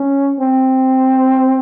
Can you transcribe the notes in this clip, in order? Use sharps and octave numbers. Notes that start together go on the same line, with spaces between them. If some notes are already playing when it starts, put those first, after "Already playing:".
Already playing: C#4
C4